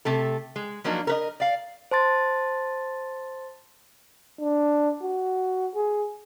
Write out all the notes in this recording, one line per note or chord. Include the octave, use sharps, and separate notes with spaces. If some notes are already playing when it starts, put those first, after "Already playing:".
C3 A3 A4
G#3
F3 F#3 A#3 D4 D#4 A#4
A#4 B4 D#5
D5 F5
C5 A5 C6 A6
D4
F#4
G#4